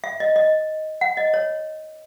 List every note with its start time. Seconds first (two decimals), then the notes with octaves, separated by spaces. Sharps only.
0.04 E5
0.20 D#5
0.36 D#5
1.01 F#5
1.17 D#5
1.34 C#5